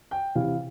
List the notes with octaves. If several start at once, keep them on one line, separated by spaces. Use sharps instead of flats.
G5
C3 E3 F5